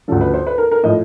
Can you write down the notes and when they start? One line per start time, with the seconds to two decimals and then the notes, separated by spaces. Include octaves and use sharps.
0.08 D2 C#3 F3 A4
0.21 B4
0.34 C5
0.47 B4
0.58 A#4
0.71 A#4
0.83 A2 F3 D#5